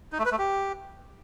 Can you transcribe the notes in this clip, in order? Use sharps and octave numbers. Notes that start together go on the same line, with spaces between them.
D#4
A3
B4
A3
G4